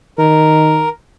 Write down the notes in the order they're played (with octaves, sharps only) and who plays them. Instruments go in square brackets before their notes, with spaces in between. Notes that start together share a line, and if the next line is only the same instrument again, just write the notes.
[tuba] D#3 [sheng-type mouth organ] A#4